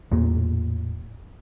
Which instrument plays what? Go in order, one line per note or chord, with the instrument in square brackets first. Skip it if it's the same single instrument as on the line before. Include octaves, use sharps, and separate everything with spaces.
[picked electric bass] A1 E2 A#2 A#3